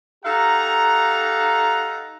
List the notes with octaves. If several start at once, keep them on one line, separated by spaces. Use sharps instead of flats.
D#4 G4 A4 F5 F#5 A#5